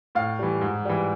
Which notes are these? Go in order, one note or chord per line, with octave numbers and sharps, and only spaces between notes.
A2 F5
E3 G3
G#2
E3 G3